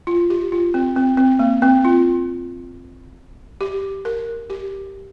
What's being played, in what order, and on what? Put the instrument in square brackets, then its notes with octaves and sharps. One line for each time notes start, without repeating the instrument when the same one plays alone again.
[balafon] F4
G4
F4
C4
C4
C4
A#3
C4
F4
G4
A#4
G4